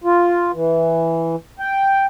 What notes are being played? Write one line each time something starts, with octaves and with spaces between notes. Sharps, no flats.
F4
E3
G5